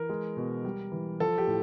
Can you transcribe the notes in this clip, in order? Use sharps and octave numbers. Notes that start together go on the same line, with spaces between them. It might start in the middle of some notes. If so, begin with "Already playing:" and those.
Already playing: E3 A#4
G#3
B2
G3
E3
F3 A4
G4
A2